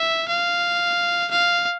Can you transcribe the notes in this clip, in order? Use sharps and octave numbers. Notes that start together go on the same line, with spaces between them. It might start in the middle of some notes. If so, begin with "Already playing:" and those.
Already playing: E5
F5
F5